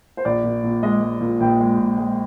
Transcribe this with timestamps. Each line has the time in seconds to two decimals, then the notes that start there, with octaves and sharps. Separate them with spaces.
0.17 C5
0.25 A#1 D5
0.44 A#2
0.63 A#2
0.83 G#3 D#5
1.01 G#3
1.21 A#2
1.40 A#1 G5
1.60 G#3
1.79 A#2
1.98 G#3